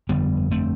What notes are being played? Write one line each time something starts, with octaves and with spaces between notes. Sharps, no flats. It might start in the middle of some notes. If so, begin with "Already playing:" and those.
G1 F2 D3 G3 B3
A3 C4